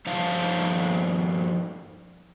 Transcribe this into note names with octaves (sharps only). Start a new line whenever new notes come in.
G2 F3 D#4 C5 F5 A5